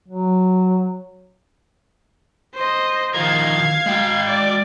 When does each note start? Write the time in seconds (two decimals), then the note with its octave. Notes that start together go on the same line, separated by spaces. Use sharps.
0.08 F#3
2.54 C5 D#5
3.14 D#3 F3 A#4 F5 G#6
3.86 G#3 G5
4.26 D5